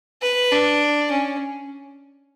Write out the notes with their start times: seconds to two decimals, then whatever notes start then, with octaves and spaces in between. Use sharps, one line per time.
0.22 B4
0.52 D4
1.11 C#4